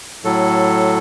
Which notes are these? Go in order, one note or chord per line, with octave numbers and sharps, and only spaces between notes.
A2 F#3 A4